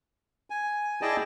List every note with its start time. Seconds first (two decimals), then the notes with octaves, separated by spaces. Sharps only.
0.50 G#5
1.02 E4 G#4 D5 D#5 G5 A5